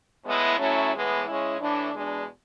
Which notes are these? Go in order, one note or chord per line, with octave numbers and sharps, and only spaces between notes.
A2 G#3 B3 E4
A2 F#3 A3 C#4 E4
A2 E3 G#3 B3
C#3 G#3 C#4 E4
A2 E3 A3 D4
E2 B2 G#3 D4